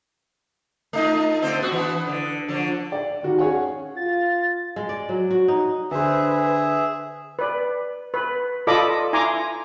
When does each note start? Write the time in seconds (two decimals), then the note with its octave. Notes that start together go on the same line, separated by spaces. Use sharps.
0.93 A3 D#4 F4
1.42 D3 C4 C5
1.58 B3 F#4
1.72 E3 B3
2.07 D3
2.48 D3 F3
2.92 D5
3.23 D#3 F#4
3.38 C#4 G#4 C#5 F#5 G#5
3.96 F4 A6
4.76 G#3
4.89 D5
5.09 F#3
5.31 F#4
5.48 D#4
5.91 D3 G#4 B4 C5 E5
7.39 B4 D5
8.14 B4
8.67 F4 A4 D5 D#5 B5 D6
9.13 E4 G#5 A#5 C6 D6